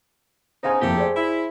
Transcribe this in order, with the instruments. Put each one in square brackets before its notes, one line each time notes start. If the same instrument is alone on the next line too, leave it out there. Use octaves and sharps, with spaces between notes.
[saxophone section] C#3 B3 D#4 [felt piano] C5 F5 G#5
[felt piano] F2 A#3 [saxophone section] A3 E4 G4
[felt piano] G#4 C5 D5
[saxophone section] E4